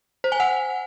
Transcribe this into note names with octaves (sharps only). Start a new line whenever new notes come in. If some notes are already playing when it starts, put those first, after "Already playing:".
C5
G#5
F#5